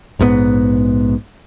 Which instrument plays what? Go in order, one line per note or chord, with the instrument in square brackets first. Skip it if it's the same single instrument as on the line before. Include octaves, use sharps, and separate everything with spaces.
[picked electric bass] A#1 G#2 C#3 B3